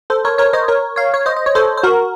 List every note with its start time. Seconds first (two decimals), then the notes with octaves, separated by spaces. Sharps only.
0.10 A4 C5
0.25 A#4 C#5
0.38 A#4 C#5
0.53 C5 D#5
0.68 A#4 C#5
0.96 C#5 F5
1.14 C#5
1.26 C5 D#5
1.36 D#5
1.46 C#5
1.55 A4 C5
1.77 C5
1.83 F#4 A#4